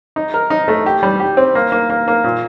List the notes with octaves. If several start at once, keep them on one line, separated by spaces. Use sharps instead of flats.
D#4
A#4
D#4
A3
G4
G3
G4
C4
A#3
A#3
A#3
A#3
A#2